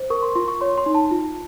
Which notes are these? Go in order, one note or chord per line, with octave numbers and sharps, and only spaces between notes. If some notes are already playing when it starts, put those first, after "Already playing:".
Already playing: C5
A#4 C#6
C6
F4 C6
C#6
C#5 C6
C6
D#4
A5
F4